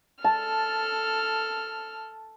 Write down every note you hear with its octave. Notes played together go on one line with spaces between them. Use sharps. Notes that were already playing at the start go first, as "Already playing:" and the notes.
A4 A5 F6